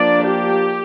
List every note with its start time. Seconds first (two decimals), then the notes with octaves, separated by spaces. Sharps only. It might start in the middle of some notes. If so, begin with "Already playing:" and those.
Already playing: F3 A#3 D4 D5
0.25 G4